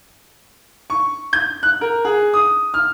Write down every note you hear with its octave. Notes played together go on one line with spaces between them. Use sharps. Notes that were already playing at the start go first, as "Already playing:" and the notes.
C#6
G6
F#6
A#4
G#4
D#6
F6